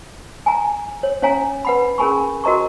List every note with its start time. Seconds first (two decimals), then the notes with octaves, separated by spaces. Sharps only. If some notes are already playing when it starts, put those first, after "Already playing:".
0.46 G#5 A#5
1.03 C#5
1.22 C#4 C#5 F5 G#5 A#5
1.65 B4 F#5 B5
1.98 C#4 G#4 A#4 G#5 B5 C#6
2.44 F#4 A#4 D#5 A#5 C#6